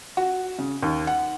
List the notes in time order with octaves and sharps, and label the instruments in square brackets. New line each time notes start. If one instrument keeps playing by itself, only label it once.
[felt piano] F#4
C#3
D#2
F#5